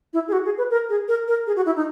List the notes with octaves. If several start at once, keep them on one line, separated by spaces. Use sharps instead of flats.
E4
G#4
F#4
G#4
B4
A#4
G#4
A#4
A#4
G#4
F#4
E4
D#4